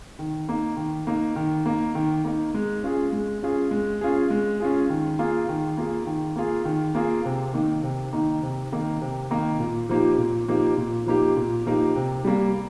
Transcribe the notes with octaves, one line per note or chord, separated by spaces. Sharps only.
D#3
A#3 D#4
D#3
A#3 D#4
D#3
A#3 D#4
D#3
A#3 D#4
G#3
C#4 F4 G#4
G#3
C#4 F4 G#4
G#3
C#4 F4 G#4
G#3
C#4 F4 G#4
D#3
A#3 F4 G#4
D#3
A#3 F4 G#4
D#3
A#3 F4 G#4
D#3
A#3 F4 G#4
C3
D#3 A#3 D#4
C3
D#3 A#3 D#4
C3
D#3 A#3 D#4
C3
D#3 A#3 D#4
A#2
F3 A#3 D#4 G4
A#2
F3 A#3 D#4 G4
A#2
F3 A#3 D#4 G4
A#2
F3 A#3 D#4 G4
C3
G3 A#3